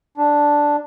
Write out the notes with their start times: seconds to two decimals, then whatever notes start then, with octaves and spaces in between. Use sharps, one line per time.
0.17 D4